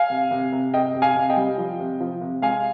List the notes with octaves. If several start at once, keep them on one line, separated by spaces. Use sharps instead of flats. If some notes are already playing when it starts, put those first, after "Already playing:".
Already playing: F5 G#5
C3
C3
C3
C3 D#5 G5
C3
F5 G#5
C3
D#5 G5
G3
F3
C3
F3
C3
G#3 F5 G#5